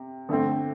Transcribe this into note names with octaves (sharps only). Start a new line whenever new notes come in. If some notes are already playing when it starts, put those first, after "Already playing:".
Already playing: C3
D3 A3 C4